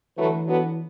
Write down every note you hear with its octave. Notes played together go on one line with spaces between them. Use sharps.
D3 E3 F#3 A3 E4 B4
F#3 B3 D4 F#4 A4